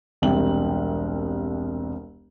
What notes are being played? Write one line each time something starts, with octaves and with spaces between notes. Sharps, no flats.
E1 C2 C3 G5 F#7